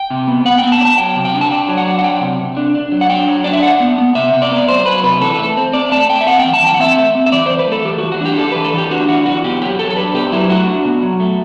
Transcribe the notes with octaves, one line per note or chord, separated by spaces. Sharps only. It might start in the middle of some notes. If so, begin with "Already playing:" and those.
Already playing: G5
C3
B3
B3 F#5
B3 G5
A5
D4
A5
F#3 G5
C3
G5
D4
A5
D4 G5
F#3
F#5
D4
F#5
F#3 G5
C3
C3
D4
D4
F#3
F#5
D4 G5
F#3
D4 D5
E5
D4 F#5
B3
B3
C3 E5
C3
D5
B3
F#3 C5
F#3 B4
C3 B4
E3 A4
A3 A4
C4
C4 D5
A3 A5
A3 G5
E5
C4 F#5
G5
E3
A5
E3 G5
F#5
C4 E5
A3
C4
E5
E3 D5
E3 C5
B4
A3 A4
E3 G4
F#4
E3
F#4
D4 G4
D4 A4
E3 B4
A4
E3 G4
D4 F#4
E3 F#4
E3 F#4
B2 G4
F#3 G4
F#3 A4
A4
D4 B4
B2 G4
F#3 E4
A3 F#4
D4
B2
F#3
A3